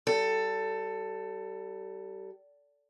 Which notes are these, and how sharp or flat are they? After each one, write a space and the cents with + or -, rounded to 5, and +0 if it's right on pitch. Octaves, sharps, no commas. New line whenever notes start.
G3 -25 A4 +15